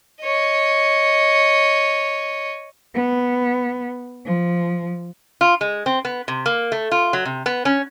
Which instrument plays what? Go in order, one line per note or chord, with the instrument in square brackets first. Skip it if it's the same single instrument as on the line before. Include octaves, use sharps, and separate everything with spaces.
[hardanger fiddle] C#5 D#5
[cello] B3
F3
[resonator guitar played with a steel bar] F4
G#3
C4
B3
C3
A#3
A3
F4
F#3
C3
B3
C#4